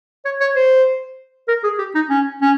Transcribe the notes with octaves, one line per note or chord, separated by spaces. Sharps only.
C#5
C#5
C5
A#4
G#4
G4
D#4
C#4
C#4